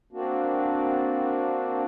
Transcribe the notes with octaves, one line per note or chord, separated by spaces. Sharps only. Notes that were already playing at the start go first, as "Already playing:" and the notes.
A#3 C4 D4 F#4